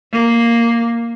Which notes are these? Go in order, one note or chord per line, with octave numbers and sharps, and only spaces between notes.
A#3